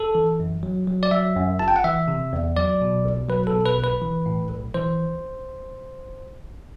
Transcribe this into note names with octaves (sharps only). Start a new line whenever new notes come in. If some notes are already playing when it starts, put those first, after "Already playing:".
Already playing: A4
E3
F#2
F#3
F#3
D5
F#3 E5
F#2
G1 A5
G5
F#5
E3 E5
C3
E2
F#3 D5
B2
B1
F#3 B4
A4
B2
B4
B1
B4
E3
A2
B1
E3 C5